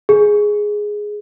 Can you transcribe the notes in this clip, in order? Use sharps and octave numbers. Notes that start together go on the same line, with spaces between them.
G#4